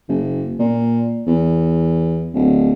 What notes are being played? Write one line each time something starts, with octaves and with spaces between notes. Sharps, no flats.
F#1
A#2
E2
D1